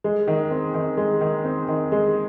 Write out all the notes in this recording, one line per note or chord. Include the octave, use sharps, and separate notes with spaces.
G#3
D#3
C4
D#3
G#3
D#3
C4
D#3
G#3